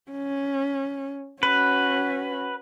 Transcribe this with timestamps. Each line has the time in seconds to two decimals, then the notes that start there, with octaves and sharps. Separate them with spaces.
0.11 C#4
1.43 C#4 F#4 B4